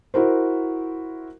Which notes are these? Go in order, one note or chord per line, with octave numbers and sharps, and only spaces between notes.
E4 F#4 A#4 C5